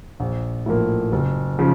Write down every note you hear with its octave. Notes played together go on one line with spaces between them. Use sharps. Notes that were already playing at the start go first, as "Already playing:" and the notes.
A#1
A2 F3 A#3
F#1
C#3 F3